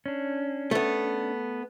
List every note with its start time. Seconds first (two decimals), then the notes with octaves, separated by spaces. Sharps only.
0.06 C#4 D4
0.71 A3 B3